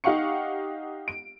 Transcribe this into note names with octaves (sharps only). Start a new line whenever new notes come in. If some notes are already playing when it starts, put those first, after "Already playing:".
D#4 G4 F5 F#5 C#6 C#7
D7